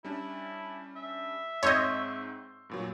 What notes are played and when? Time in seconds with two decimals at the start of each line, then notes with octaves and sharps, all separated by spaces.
0.05 G3 C#4 D4 E4
0.96 E5
1.63 G#2 C4 C#5 D#5 C6 E6 G6
2.70 G2 A#2 F#3